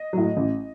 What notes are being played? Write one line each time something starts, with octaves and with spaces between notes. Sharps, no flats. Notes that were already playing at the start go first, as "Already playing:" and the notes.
Already playing: D#5
A2 F#3
A1